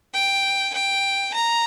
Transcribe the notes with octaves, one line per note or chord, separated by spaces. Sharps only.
G5
G5
A#5